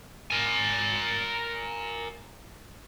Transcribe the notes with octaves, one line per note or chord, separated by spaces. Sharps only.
A#4 G#5